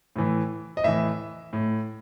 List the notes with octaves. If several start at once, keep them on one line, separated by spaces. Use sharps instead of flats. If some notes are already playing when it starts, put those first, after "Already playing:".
A2 E3
D#5
A2 E3 E5
A2